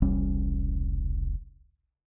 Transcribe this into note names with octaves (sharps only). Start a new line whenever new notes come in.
E1 C2 G3 C#4